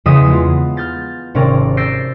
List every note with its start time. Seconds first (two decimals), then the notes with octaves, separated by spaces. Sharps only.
0.06 E2 C#3 G#3 E5 D#6
0.30 G#3 B3 F4
0.77 F6 G6 A6
1.34 G#1 C3 C#4 A#4 D5
1.77 E6 G6 A6 A#6 C7 D7